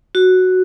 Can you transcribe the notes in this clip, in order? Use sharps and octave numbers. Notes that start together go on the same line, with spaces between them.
F#4